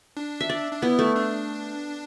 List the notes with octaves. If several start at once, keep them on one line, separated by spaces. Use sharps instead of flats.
D4
E5
D5
D4
B3 E4
A3
D4